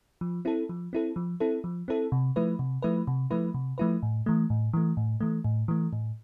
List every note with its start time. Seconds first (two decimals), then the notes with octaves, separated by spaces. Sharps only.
0.21 F3
0.45 C4 E4 A4
0.69 F3
0.93 C4 E4 A4
1.16 F3
1.40 C4 E4 A4
1.64 F3
1.88 C4 E4 A4
2.12 C3
2.36 F3 A3 E4 B4
2.59 C3
2.82 F3 A3 E4 B4
3.07 C3
3.31 F3 A3 E4 B4
3.54 C3
3.78 F3 A3 E4 B4
4.03 A2
4.26 E3 A3
4.50 A2
4.74 E3 A3
4.97 A2
5.21 E3 A3
5.45 A2
5.68 E3 A3
5.93 A2